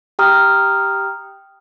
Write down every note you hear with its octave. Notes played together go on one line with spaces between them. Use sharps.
G4 G5 A#5 D#6 F6